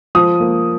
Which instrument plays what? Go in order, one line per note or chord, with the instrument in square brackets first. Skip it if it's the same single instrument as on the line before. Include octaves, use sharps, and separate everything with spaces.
[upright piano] F3 D#6
A#3